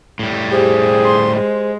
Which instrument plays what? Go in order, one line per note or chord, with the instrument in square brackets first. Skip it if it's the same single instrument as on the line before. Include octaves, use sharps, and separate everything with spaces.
[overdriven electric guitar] A2 G3
[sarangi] G4 [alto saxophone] G#4 [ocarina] C5
[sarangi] C6
G#3